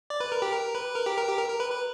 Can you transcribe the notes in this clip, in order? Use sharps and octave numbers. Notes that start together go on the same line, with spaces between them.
D5
B4
A#4
G4
A#4
B4
A#4
G4
A#4
G4
A#4
A#4
B4
B4